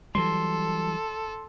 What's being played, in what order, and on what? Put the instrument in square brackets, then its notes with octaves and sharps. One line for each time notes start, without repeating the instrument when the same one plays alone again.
[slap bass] E3 F#3 G3 [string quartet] A4 [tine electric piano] C6